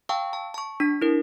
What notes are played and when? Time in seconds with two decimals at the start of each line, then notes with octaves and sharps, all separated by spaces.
0.09 F5 G5 A5 C#6 E6
0.33 A5
0.54 A5 C#6
0.80 D4 B6
1.01 E4 A#4